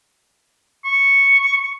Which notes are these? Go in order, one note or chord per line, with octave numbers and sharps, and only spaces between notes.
C#6